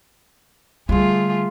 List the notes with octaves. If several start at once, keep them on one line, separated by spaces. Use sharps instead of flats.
D3 G3 A3 F4 G#4